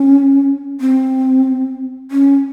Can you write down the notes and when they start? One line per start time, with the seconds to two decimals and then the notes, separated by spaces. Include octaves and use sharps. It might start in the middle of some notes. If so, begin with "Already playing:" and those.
Already playing: C#4
0.81 C4
2.11 C#4